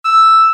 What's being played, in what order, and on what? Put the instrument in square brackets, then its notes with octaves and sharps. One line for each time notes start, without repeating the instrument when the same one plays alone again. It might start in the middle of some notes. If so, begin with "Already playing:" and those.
[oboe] E6